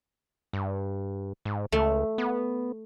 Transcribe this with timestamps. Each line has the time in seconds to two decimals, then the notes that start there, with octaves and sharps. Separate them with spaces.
0.53 G2
1.45 G#2
1.72 C#2 A3
2.18 B3